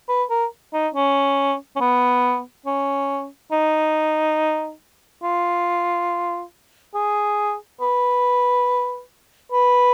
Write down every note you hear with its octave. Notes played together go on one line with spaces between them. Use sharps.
B4
A#4
D#4
C#4
C#4
B3
C#4
D#4
F4
G#4
B4
B4